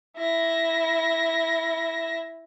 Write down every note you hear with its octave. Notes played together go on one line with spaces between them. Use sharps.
E4 A#6